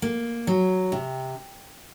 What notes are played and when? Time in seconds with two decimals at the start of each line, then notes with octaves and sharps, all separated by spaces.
0.02 A#3
0.47 F#3
0.92 C3